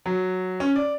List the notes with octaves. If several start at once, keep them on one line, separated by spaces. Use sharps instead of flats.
F#3
C#4
D5